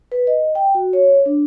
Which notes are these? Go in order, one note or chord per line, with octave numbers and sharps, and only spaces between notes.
B4
D#5
G5
F#4
C#5
D4